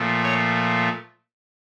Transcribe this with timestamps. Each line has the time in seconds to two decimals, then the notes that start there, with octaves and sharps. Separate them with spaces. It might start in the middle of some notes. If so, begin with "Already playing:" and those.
Already playing: A#2 F3 A3
0.23 C#5